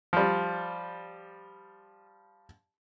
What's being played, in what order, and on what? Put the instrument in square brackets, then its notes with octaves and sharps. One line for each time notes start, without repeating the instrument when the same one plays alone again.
[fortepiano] F3 G3